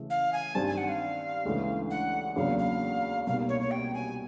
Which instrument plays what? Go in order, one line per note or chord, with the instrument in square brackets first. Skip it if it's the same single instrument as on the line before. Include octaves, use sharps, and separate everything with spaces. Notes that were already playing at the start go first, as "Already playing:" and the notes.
Already playing: [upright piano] C#3 E3 A3
[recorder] F5
G#5
[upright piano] G2 D#3 G3 C4 [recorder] A5
[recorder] G#5
F#5
F5
[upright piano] D2 C#3 E3 G#3
[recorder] F#5
[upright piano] E2 C#3 F#3 A#3 D4 [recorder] F5
[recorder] F5
[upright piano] C2 B2 G3 A#3 D#4 [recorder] F5
[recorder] C#5
C#5
G5
G#5